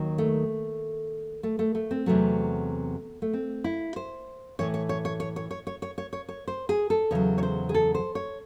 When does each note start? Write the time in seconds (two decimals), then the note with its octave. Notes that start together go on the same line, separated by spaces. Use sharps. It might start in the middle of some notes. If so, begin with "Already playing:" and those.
Already playing: D#2 D#3 F#3
0.18 A3
1.43 A3
1.59 A3
1.75 A3
1.91 C4
2.06 E2 C3 F#3 A3
3.22 A3
3.33 C4
3.64 E4
3.96 C5
4.59 A2 E3 C#5
4.74 C#5
4.89 C#5
5.05 C#5
5.20 C#5
5.36 C#5
5.51 C#5
5.67 C#5
5.82 C#5
5.98 C#5
6.13 C#5
6.29 C#5
6.48 C5
6.69 G#4
6.90 A4
7.11 E2 C#3 F#3 C#5
7.38 C#5
7.43 C5
7.69 G#4
7.74 A4
7.95 C5
8.15 C#5